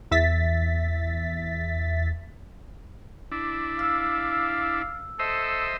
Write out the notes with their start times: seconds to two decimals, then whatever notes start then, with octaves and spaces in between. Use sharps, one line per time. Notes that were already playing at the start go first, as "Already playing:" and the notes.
0.11 E2 E5 A6 B6
3.32 D4 E4
3.79 F5 E6
5.19 A4 C5 D#5 E5